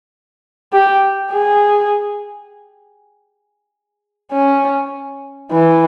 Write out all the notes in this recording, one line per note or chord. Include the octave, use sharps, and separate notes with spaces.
G4
G#4
C#4
E3